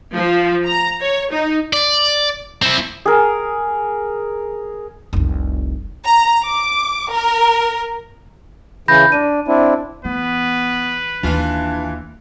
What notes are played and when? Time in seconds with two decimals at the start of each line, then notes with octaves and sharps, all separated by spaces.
0.13 F3
0.65 A#5
1.01 C#5
1.31 D#4
1.73 D5
2.62 C4 E4
3.06 G#4 A#4
5.13 F1 C2
6.05 A#5
6.45 D6
7.12 A#4
8.88 C#3 E3 B5 G6 A#6
9.12 D4 D#7
9.48 C4 D4 E4
10.05 E3 B3 B4
11.23 D#2 E3 D4 F4